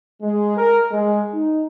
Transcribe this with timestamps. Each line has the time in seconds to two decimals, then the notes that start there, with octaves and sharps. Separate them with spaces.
0.22 G#3
0.57 A#4
0.91 G#3
1.33 D#4